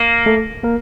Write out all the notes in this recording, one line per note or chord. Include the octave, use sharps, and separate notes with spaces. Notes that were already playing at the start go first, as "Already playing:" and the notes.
Already playing: A#3
A3 A4
A#3 A#4